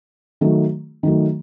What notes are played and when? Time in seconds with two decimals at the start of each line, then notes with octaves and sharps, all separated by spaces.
0.41 D#3 F#3 A3
1.03 D#3 F#3 A3